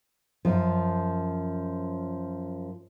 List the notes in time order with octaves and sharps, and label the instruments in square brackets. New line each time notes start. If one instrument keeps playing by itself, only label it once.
[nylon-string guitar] F#2 F3